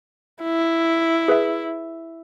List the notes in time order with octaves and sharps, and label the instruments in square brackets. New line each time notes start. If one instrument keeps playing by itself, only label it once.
[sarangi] E4
[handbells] G#4 B4 E5